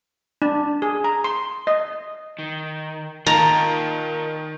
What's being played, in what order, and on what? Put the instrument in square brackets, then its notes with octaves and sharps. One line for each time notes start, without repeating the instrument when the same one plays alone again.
[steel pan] D4
G#4
A#5
C6
D#5
[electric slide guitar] D#3
[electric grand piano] D#3 [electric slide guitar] F4 A#4 [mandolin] A5 [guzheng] A#5